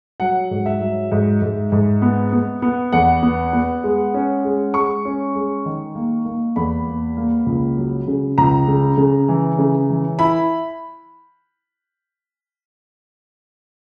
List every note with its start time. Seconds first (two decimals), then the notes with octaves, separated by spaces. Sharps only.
0.20 F#3 F#5
0.51 G#2
0.66 E5
0.81 F#3
1.12 G#2
1.42 G#2
1.72 G#2
2.02 B3
2.32 B3
2.62 B3
2.93 E2 F#5
3.23 B3
3.53 B3
3.84 G#3
4.14 C#4
4.44 G#3
4.74 G#3 C#6
5.05 C#4
5.35 G#3
5.66 D#3
5.95 A#3
6.25 A#3
6.56 E2 B5
6.87 A#3
7.17 A#3
7.46 C#2
7.77 F#3
8.08 C#3
8.38 C#2 A#5
8.68 C#3
8.98 C#3
9.28 E3
9.58 C#3
9.90 E3
10.19 E4 B5